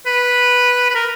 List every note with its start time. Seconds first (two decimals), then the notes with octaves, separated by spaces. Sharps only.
0.06 B4
0.90 B4
0.95 A#4